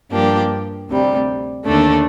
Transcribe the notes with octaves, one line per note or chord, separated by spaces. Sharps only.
G2 F3 A#3 D4 G4
D2 C3 G3
D#2 D3 A3 D4 A4